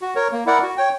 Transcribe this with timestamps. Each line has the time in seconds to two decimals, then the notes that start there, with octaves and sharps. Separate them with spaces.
0.02 F#4
0.16 A#4 C#5
0.32 A#3
0.46 E4 A#4 D5 F#5
0.63 F#4
0.77 C#5 G5